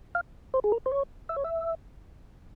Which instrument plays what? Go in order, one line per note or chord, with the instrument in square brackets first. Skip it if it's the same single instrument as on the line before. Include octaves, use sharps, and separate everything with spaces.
[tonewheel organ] F5
C5
G#4
A#4
C5
C#5
E5
C#5
E5